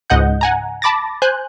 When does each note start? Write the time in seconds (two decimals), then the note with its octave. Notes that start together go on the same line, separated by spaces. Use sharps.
0.10 C#2 G#2 D#5 F#5 G6
0.41 F#5 G#5 A#5
0.82 A5 B5 D6 A6 A#6
1.22 C5 G#5 F#6 G6